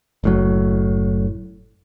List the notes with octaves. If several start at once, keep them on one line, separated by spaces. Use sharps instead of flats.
F#1 A2 F#3